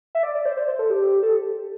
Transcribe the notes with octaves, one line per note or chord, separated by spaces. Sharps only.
E5
D5
D5
C5
C5
C5
A4
G4
A4